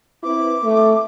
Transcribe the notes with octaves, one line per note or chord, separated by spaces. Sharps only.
C4 E4 B4 D6
A3